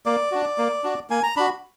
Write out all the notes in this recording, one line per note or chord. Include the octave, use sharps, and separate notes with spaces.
A#3 D5
D4 F#4
A#3
D4 F#4
A#3 G#5
A#5
D4 F#4 B5